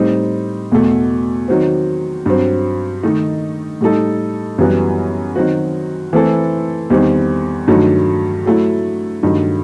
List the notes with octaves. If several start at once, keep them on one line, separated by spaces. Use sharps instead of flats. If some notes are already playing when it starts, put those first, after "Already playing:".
Already playing: A2 G3 C4 D#4
E2 B2 A3
D#3 F#3 C4
G2 F#3 C4
D#3 A3 D#4
A2 G3 D#4 A4
F#2 E3 G3 B3 F#4
D#3 F#3 C4 F#4
E3 A3 C4 E4 A4
E2 D#3 G3 C4
G2 D#3 F#3 A3
F#3 A3 E4
G2 D#3 F#3 A3